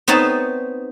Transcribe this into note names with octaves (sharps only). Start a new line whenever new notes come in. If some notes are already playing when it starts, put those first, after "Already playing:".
B3 C4 D#4 C#5 A5